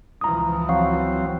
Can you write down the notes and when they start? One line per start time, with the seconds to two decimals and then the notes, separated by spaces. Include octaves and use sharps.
0.21 C#2 E3 F3 A#5 D#6
0.69 F#3 C4 F5 C#6